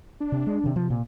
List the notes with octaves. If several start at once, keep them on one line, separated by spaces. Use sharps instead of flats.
D4
C3
G#3
C3 D#3
C3 F3
A#2